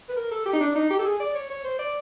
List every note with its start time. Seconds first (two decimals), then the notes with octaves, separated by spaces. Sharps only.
0.09 B4
0.16 A#4
0.31 A4
0.46 G4
0.53 D#4
0.61 D4
0.75 D#4
0.90 G4
0.99 A4
1.05 G#4
1.20 D5
1.35 C#5
1.50 C#5
1.64 C5
1.79 D5